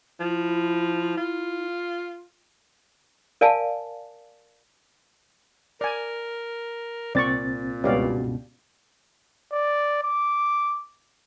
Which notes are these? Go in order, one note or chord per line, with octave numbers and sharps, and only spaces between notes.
F3 E4
F4
A#4 D5 F5 G#5 A5
A#4 D5 G#5
C2 A#2 C4 D5 C#6 A6
C#2 G2 B2 G4 D5 F5
D5
D6